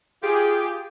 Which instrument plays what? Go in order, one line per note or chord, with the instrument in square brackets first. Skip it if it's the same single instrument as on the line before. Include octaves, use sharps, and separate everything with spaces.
[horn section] F4 G4 [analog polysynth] G#4